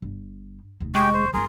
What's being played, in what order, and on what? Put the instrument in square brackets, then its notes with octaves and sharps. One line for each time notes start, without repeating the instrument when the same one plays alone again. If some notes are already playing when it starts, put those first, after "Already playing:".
[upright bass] G1
F1 D#2
[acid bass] G#3 [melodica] G4 G5 [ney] C#6
[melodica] C5
[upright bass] G1 E4 [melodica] G#4 A#4 [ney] C6